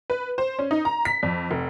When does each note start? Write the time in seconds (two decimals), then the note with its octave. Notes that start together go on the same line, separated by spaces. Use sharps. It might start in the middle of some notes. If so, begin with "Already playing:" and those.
0.10 B4
0.38 C5
0.59 C#4
0.71 D#4
0.85 A#5
1.05 B6
1.23 F2
1.51 F1